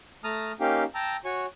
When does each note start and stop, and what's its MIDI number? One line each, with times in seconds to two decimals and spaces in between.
0.24 0.52 57
0.24 0.52 81
0.24 0.52 82
0.24 0.52 87
0.24 0.52 89
0.60 0.84 58
0.60 0.84 61
0.60 0.84 63
0.60 0.84 67
0.60 0.84 77
0.60 0.84 79
0.95 1.17 79
0.95 1.17 81
0.95 1.17 82
0.95 1.17 88
1.25 1.46 66
1.25 1.46 73
1.25 1.46 80
1.25 1.46 85